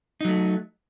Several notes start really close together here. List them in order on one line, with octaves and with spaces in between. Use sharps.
D#4 F#3 A3